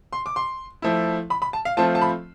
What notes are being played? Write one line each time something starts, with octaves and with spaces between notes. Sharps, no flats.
C6
D6
C6
F3 A3 E4
B5
B5
A5
F5
F3 A3 C4 F4 A5
A5
B5